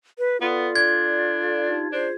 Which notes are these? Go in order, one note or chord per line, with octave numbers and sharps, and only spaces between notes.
B4
B3 F4 A4 D5
D4 G#6
A4 D5 F5
D#4 G4 A5
D4 F4 G#4 C5